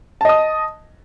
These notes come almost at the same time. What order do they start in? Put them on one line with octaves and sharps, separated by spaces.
A5 D#5 D#6